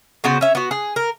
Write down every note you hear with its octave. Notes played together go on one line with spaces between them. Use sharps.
C#3 B3 F#4 C5
C#4 E5
B3 F#4
G#4
A#4